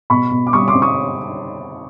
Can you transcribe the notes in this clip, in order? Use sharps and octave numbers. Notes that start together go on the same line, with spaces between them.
B2 B5 C#6
B2
D6
G3 C#6 D#6
C6 D6
C4
C#6 D#6